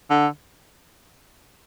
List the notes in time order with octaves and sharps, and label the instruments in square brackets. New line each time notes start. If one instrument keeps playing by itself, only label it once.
[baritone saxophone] D3